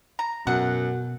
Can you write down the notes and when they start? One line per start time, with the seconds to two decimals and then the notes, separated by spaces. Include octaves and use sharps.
0.19 A#5
0.47 F#2 B2 F#5